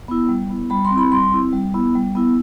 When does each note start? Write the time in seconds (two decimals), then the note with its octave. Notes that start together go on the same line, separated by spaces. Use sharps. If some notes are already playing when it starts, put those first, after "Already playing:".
0.08 B3 E4
0.29 G3
0.50 B3 E4
0.70 G3 B5
0.85 C6
0.91 C4
0.96 E4 B5
1.12 G3 C6
1.32 C4 E4
1.53 G3
1.74 B3 E4
1.95 G3
2.15 B3 E4